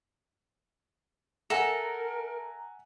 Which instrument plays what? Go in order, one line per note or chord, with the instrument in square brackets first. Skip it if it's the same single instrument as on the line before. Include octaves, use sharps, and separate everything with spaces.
[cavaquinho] A4 [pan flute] A#4 [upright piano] E5 F#5 G#5 [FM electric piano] A#5